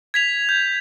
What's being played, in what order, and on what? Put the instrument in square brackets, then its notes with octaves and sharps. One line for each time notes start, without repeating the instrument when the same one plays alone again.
[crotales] G#6 B6 F7
G6